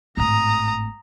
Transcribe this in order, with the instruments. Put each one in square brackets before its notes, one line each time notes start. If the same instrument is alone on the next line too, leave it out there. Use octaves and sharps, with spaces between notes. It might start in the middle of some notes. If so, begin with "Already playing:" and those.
[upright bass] G#1 A2 [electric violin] A#5 D#6